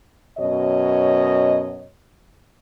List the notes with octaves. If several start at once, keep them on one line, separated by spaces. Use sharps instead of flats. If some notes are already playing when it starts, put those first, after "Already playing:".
F#2 B2 C#5 D#5